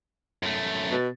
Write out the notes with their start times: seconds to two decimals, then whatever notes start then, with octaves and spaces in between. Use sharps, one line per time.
0.43 F#2 A3
0.91 B2